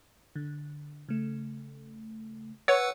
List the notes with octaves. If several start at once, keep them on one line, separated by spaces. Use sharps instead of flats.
D3
C#3 A3
B4 C#5 F#5 E6